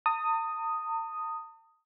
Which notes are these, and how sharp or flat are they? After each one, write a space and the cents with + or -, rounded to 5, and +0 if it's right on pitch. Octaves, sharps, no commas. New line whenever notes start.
A5 +45 D#6 +0